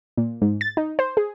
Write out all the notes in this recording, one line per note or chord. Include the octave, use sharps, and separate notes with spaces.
A#2
G#2
A6
D#4
C5
G#4